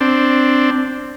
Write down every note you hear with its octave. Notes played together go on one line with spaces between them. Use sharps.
C4 D4